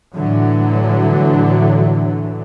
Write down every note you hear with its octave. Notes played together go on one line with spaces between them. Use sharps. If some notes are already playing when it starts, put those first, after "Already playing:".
A2 D3 E3 F#3